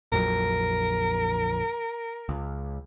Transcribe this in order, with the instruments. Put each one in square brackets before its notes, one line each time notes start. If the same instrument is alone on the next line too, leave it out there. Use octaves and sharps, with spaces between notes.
[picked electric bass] A#1 F2 F#3 [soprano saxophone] A#4
[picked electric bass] C#2